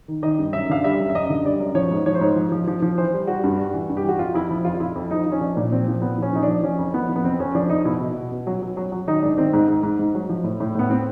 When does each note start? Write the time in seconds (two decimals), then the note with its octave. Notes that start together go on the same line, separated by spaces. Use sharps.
0.08 D#3
0.23 D#3 D#5
0.39 G2
0.53 F#2 E5
0.69 D3 F5
0.84 G3 E5
1.00 F#2
1.10 E5
1.15 F#2 D#5
1.30 D3
1.44 G3 D5
1.60 F#2
1.75 F3 C#5
1.91 G#2
2.06 F3 C#5
2.15 C5
2.21 G#2 C#5
2.36 F3
2.52 F3
2.68 F3
2.82 F3
2.98 E3 C5
3.13 G3
3.27 G3 F#4
3.44 G2
3.58 G3
3.74 E3
3.89 G2
3.97 G4
4.04 E3 F#4
4.19 F2 F4
4.34 F2 E4
4.49 F3 E4
4.65 F2 F4
4.75 F4
4.80 F2 E4
4.95 F2
5.11 F3 D#4
5.26 F3
5.32 C#4
5.41 F3 D4
5.57 A#2
5.72 F3 C4
5.88 F3
6.02 A#2 B3
6.18 F3 C#4
6.33 F3 D#4
6.43 D4
6.48 F3
6.63 F3 C#4
6.79 F2
6.94 F3 B3
7.09 F3
7.16 B3
7.24 F2 C4
7.39 F2 C#4
7.55 F3 D4
7.69 F2 D#4
7.85 B2 E4
8.00 B2
8.16 B2
8.32 B2
8.47 F#3
8.62 F#3
8.77 F#3
8.92 F#3
9.07 D#3 D#4
9.22 G#2 D4
9.37 D#3 C4
9.53 G#2
9.68 G#2
9.83 G#2
9.99 G#2
10.15 F#3
10.29 F3
10.44 A2
10.60 A2
10.75 A2 B3
10.90 A2 C4